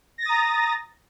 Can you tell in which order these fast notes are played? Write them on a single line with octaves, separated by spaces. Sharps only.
A#6 A6 D#6 A#5